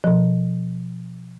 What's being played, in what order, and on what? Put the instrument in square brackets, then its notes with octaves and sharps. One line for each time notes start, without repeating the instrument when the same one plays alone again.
[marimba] B2 F3